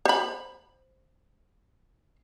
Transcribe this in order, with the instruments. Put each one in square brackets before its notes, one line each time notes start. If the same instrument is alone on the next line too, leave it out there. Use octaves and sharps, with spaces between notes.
[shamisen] C5 B5